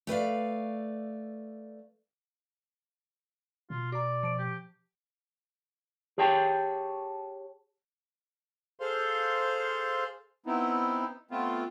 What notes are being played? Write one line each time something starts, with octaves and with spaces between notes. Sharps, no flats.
A3 B4 D5 F5
B2 F4
F#4 D5 A#5
F3 D7
G4
G4 G#4 C#5 G5 A5
G#4 A4 C5 F5 C6
B3 C4 D#4 E4
A3 B3 C4 F4